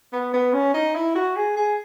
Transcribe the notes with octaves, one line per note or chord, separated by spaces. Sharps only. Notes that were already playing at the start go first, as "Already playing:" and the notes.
B3
B3
C#4
D#4
E4
F#4
G#4
G#4